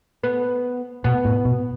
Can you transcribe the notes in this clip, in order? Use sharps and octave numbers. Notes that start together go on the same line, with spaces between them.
B3
B2 B3
A2
B2